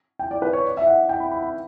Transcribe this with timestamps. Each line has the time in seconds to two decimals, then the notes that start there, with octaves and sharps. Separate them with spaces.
0.19 G5
0.31 D5
0.42 B4
0.53 C#5
0.64 D5
0.77 E5
0.87 F#5
1.09 G5
1.20 B5
1.31 B5
1.42 B5